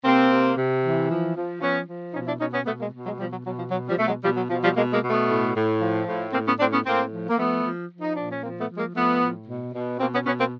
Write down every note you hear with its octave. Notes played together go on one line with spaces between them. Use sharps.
C3 A#3 C4
C3
C3
E3
F3
F3
F3 B3 C#4
F3
B2 C#4 D#4
D4 E4
B2 C#4 D#4
B3 C#4
B2 A3 B3
G#3 A#3
B2
F#3 G#3
B2 F3 G3
F#3
B2 F#3
F3
B2 F#3
F3 G3
B2 A3
F#3 G#3
B2 F3 G3
F#3
B2 F3
F3 G3
B2 G#3 A#3
G#3 A#3
B2
A3 B3
A2
A2
F3
A2
A2 A#3 C4
B3 C#4
A2 C4 D4
B3 C#4
A2 A#3 C4
F3
A#3
F3 A3 B3
F3
F3
D#4
A#2 D4
C#4
F3 A#3 C4
A3 B3
F3
G#3 A#3
F3 A3 B3
A2
B2
B2
B2 A#3 C4
B3 C#4
B2 B3 C#4
A#3 C4